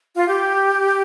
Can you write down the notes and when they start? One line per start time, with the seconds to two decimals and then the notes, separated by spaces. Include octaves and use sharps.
0.15 F4
0.28 G4